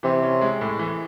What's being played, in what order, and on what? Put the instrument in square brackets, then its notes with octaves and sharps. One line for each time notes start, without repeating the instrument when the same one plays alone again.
[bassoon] C3 [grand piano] E3
[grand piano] C#4
G#3
A2
E3